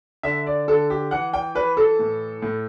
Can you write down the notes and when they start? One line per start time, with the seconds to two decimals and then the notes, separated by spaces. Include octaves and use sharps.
0.23 D3 E5
0.46 D5
0.68 D3 A4
0.90 G4
1.11 E3 F#5
1.33 G5
1.55 E3 B4
1.77 A4
1.99 A2
2.42 A2